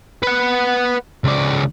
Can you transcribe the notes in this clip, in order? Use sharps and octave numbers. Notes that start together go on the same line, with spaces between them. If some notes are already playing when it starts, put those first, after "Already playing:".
B4 F#5
C#2 D5